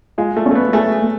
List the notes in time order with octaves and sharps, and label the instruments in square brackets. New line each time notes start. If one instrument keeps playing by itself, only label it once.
[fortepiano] G#3 [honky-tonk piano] F4
[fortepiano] A3
[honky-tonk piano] C#4
[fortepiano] A3
B3
[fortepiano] A3 [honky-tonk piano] G#4
[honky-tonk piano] A3